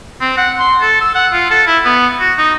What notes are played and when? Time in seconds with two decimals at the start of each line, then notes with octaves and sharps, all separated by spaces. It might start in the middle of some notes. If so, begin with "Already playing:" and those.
0.21 C4
0.37 F#5
0.59 C6
0.80 A4
1.01 E6
1.15 F#5
1.33 F4
1.50 A4
1.67 E4
1.85 B3
2.20 F#4
2.38 D#4